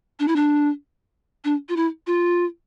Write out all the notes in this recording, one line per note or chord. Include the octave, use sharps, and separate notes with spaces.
D4
E4
D4
D4
F4
E4
F4